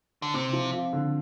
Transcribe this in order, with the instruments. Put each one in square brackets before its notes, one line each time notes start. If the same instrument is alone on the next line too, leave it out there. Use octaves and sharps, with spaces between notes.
[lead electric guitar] D3
[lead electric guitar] C3 [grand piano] C4
[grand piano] F3
F4
D3